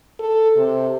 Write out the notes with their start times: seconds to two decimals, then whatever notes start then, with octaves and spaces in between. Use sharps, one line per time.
0.19 A4
0.57 C3